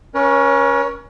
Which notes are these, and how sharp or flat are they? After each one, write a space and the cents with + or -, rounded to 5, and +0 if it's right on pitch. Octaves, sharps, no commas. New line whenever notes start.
C#4 +0 A#4 +45 C#5 +20